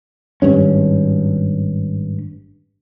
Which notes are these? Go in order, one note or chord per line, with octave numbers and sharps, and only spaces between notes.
G#1 G2 C#4